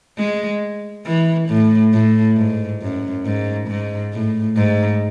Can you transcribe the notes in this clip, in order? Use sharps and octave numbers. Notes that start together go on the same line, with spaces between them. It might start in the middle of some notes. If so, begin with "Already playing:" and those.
G#3
E3
A2
A2
G#2
F#2
G#2
G#2
A2
G#2